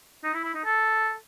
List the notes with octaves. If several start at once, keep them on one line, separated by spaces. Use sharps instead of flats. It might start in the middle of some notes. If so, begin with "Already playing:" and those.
D#4
E4
E4
D#4
A4